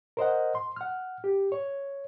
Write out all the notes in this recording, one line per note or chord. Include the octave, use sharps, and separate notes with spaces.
A#4 C5 D#5 F#5
C6
F#5 F6
G4
C#5